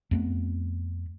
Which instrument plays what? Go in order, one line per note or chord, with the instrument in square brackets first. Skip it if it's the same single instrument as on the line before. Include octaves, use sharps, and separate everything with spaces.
[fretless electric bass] F2 A3 B3